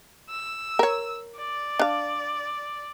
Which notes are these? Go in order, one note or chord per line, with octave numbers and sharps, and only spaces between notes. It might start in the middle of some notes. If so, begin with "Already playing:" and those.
E6
A#4 C#5
D5
D4 F5